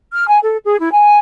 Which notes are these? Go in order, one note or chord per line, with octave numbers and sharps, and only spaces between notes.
F6
G#5
A4
G#4
E4
G#5